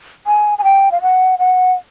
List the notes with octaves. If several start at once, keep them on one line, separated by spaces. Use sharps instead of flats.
G#5
G#5
G5
F5
F#5
F#5